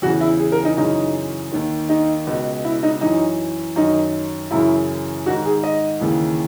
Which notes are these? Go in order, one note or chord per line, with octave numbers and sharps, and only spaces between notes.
E2 C#3 E3 F#4
E4
G#4
A#4
D#4
F#2 C#3 E3 D#4
D#2 D#3
D#4
C#2 B2
E4
D#4
F#2 E3 D#4
F#2 D#3 D#4
F#2 C#3 E3 E4
G#2 D#3 F#4
G#4
D#5
D#2 C#3 E3